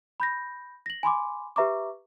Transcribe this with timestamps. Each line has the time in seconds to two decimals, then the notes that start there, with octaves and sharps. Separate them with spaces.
0.20 B5 G6 A#6
0.86 A#6 F#7
1.03 G#5 B5 C6 D6
1.56 G4 B4 E5 A#5 C#6 D6